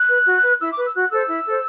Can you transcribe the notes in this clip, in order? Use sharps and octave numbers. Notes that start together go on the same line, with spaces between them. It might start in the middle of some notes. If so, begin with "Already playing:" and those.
Already playing: F#6
B4
F#4
B4
E4 E6
D6
B4
E6
F#4 F#6
A4 C5 E6
E4
A4 C5